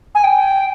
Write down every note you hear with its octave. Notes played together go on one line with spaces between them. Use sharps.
G#5
G5